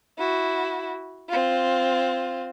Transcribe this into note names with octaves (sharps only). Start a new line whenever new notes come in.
E4 F#4
C4 F4